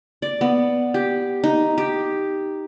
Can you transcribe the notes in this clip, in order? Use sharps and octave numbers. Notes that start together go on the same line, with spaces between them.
D5
B3
G4
D#4
G4